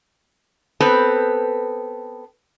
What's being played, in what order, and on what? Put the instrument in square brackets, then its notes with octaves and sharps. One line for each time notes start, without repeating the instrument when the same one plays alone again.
[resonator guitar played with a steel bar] B3 C4 A4 B4